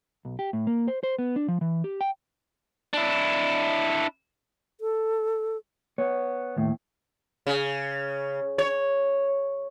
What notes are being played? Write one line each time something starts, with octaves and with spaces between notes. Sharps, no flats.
B1
G4
A2
A#3
C5
C5
B3
D4
F3
E3
G4
G5
D4 E4
A4
B3 C#5
D#2 A2
C#3
C#5